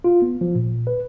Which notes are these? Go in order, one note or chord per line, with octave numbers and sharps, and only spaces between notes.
F4
B3
F3
A#2
B4